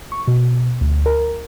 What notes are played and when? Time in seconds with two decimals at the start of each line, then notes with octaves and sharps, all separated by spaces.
0.12 C#6
0.27 B2
0.81 D2
1.06 A#4